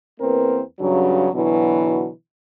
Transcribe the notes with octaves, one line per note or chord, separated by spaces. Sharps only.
E2 A#3 C4 A#4 B4
G2 C#3 F#3
B2 D3 E3 F#3